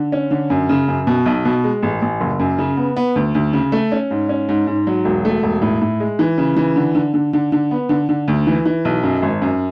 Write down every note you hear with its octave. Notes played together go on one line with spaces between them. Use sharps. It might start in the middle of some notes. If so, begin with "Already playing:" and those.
Already playing: D3
C#4
D3
F#2
C#3
F#2
B2
B1
B2
G#3
A1
A1
F#1
F#2
C#3
B3
B3
D2
D2
C#3
A3
C#4
G#2
C#4
G#2
G#2
F#3
E1
A3
E1
A2
A2
G#3
E3
C#3
E3
D3
D3
D3
D3
D3
B3
D3
D3
D2
E3
E3
B1
F#2
G#1
F#2